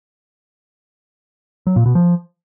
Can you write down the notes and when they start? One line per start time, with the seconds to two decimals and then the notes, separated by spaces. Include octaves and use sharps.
1.67 F#3
1.76 A#2
1.86 B2
1.95 F3